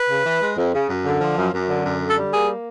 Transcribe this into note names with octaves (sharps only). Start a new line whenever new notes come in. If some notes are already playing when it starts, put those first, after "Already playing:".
Already playing: B4
C#3
E3
G#3
F2
C#3
F#2
D3
F3
F#2
F#2
D3
F#2
D3
A4
G3
A#3 G#4